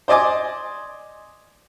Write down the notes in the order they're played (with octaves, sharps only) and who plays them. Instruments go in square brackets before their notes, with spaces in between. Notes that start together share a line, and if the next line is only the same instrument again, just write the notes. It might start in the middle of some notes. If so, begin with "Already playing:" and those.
[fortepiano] C5 D5 D#5 G#5 D6